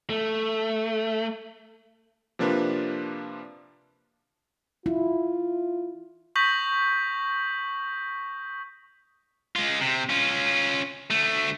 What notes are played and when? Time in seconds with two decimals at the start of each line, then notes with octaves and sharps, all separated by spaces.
0.10 A3
2.39 C3 F3 A#3 D4 F4 B4
4.86 E4 F4
6.36 C#6 D#6 G6 A#6 B6 F#7
9.56 G#3 F4
9.81 C3
10.09 C#4 F4
11.10 D2 A3